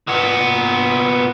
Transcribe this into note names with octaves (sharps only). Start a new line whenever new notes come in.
A#2 B3